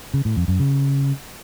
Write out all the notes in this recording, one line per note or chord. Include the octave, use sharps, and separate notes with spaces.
C#3
A2
F2
F#2
C#3